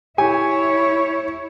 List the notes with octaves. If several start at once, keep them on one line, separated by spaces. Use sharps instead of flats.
E4 G4 C#5 G#5